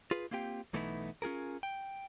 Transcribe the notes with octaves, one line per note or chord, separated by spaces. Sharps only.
F4 G#4 B4
A#3 C4 F4 G4 G5
B1 E3 A3 B3 D#4 E4
C#4 F4 G#4 A#4
G5